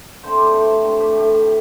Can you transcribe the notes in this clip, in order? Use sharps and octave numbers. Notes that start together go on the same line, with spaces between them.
D3 A3 C4 C5
D5
D5
C3 E3 A3 C4 C5
D3 A3 C4 C5
G4
A2 E3 A3 G4